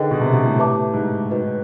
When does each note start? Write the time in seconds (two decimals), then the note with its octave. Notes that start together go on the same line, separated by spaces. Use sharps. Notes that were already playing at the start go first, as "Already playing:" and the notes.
Already playing: D3 D#4 G#4 B4 D#5 G5
0.11 B2
0.21 C3
0.33 B2
0.45 A2
0.58 G4 B4 E5 A5 D6
0.93 G#2
1.30 D#4 F#4 B4 D#5